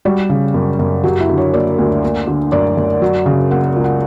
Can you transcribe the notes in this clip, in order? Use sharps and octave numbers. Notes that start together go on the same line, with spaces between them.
G3 F#4
C#3
F#2
F#2
F#3 G4
E4
D3
C#5
A#3 D5
D2
A#3
D3
F#2 D5
F#2
F#3
C#3
A#3 F#5
C#2
F#5